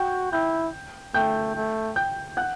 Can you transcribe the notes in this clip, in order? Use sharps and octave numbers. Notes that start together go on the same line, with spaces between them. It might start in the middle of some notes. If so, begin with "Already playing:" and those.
Already playing: F#4 G5 G6
E4 G5 G6
A3 G5 G6
A3
G5 G6
F#5 F#6